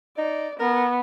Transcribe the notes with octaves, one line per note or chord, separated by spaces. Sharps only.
D#4 D5
B3 A#4